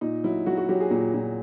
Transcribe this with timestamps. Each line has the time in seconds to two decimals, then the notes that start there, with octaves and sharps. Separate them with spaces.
0.01 A#2 D#4
0.24 F#3 E4
0.46 F#3 F#4
0.57 F#4
0.69 F#3 G4
0.80 G#4
0.91 A#2
1.14 A#2